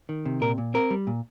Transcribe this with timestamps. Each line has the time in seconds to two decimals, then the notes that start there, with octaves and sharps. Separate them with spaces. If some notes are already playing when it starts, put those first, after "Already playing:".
0.09 D#3
0.25 C3
0.41 A#2 A#4
0.58 A#2
0.74 C4 A#4
0.90 G3
1.07 A#2